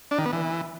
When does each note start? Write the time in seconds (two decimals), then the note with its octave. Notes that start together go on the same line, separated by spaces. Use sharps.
0.11 D4
0.18 D#3
0.26 B3
0.33 E3